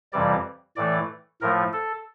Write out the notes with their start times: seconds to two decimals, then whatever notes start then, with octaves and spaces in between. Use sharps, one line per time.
0.13 F2 C3 E3 G3 D5
0.76 A2 E3 A3 D5
1.42 A2 F3 A3 A#4
1.73 A4